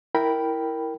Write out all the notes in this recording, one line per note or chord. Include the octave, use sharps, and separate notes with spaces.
E4 A#4 G5 B5